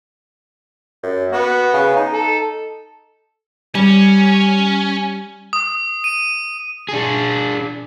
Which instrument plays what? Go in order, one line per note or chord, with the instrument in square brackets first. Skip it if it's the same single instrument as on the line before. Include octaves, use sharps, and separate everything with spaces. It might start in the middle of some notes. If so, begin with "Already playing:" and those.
[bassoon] F#2
[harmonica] B3 [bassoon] F#4
[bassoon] C#3
D#4
[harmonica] A4
[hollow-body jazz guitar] G3 [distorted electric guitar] C#4
[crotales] D#6
D#7
[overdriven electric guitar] D4 G#4